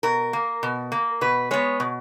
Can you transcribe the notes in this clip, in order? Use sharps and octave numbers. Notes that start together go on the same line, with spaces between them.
B2 A#4
A#3
B2
A#3
B2 B4
G#3 B3 C#5
B2